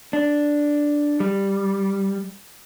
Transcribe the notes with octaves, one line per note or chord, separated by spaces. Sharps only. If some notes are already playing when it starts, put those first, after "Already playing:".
D4
G3